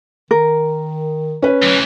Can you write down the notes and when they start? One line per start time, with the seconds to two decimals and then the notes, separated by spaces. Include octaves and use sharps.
0.31 D#3 A#4
1.42 C#4 B4
1.62 D2 E3 F#3